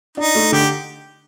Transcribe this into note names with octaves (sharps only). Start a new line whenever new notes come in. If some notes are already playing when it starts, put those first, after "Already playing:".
D4 D#4
A3
D3 G4